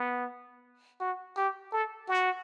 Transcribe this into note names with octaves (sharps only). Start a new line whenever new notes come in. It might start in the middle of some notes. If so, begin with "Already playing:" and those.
Already playing: B3
F#4
G4
A4
F#4